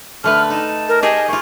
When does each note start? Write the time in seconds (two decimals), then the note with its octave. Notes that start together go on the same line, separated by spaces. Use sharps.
0.24 D3 A3 B4 F6
0.50 D#4 A5
0.89 A#4
1.03 G4 G#4 C#5 D#5
1.28 A#3 F4 C#6